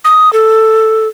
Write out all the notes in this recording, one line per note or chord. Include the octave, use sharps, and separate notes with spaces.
D#6
A4